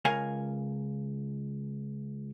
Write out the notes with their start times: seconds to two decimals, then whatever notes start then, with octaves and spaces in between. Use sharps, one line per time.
0.05 C#2 A#4 C#5 F5 G#5